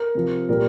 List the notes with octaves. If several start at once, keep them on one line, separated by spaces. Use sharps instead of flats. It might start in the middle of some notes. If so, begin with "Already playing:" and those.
Already playing: A#4
C3 F3
A#2 G3 A#4